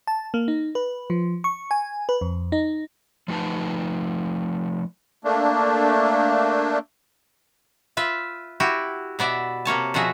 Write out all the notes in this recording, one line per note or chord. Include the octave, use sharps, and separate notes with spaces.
A5
A#3
D#4
B4
F3
C#6
G#5
B4
F2
D#4
F3 A3 D#4 B4 A5
A3 A#3 D4
F4 B4 E5
E4 F#4 G4
B2 B3 D5 E5
C3 A#3 C#5 A5
B2 F3 F#4 G#4 E5